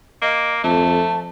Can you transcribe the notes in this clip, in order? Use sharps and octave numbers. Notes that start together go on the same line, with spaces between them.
A#3 D#5
F2 A3 A5